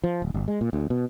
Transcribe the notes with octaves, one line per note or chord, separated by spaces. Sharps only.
F3
D1
G1
G#3
A#2
D2
B2